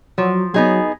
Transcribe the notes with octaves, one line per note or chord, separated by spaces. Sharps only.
F3 F#3
F#3 B3 D#4 G#4